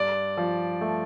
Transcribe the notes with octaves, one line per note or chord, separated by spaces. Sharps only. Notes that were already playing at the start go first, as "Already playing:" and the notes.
Already playing: G2 D5
F3
A3